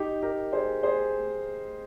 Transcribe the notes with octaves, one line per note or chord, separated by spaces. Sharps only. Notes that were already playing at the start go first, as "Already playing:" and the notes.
Already playing: D#4 G4
G4 A#4
G#4 C5
G#4 C5